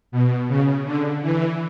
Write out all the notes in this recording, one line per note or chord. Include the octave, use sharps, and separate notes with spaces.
B2
C#3
D3
E3